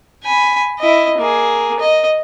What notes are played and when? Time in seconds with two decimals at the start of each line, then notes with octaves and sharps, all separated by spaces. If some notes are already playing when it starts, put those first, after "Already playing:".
0.24 G#5 B5
0.79 E4 D#5
1.18 A#3 G#4
1.80 D#5